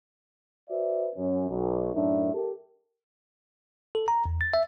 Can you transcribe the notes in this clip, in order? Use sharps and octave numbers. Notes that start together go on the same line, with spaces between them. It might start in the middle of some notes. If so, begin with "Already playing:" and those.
F#4 B4 C5 D5 E5
F#2 C#4
B1
F#2 A2 D4 D#4 A#4 E5
G4 A4 A#4
A4
A#5
E2
A6
E5